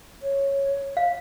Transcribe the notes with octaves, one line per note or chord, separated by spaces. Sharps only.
C#5
F5